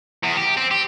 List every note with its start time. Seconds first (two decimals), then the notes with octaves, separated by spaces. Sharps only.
0.24 E2
0.37 G4
0.57 C4
0.71 G4